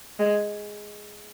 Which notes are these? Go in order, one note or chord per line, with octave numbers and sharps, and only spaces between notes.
G#3